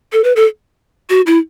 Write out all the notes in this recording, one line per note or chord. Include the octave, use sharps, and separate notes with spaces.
A4
B4
A4
F#4
E4